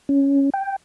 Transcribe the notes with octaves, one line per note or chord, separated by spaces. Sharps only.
C#4
G5